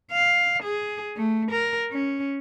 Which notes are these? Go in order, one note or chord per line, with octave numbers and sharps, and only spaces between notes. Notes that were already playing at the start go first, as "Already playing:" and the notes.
F5
G#4
A3
A#4
C#4